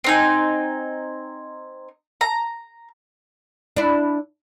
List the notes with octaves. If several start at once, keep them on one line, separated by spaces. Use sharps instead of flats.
C4 D#4 G#5
A#5
D4 E4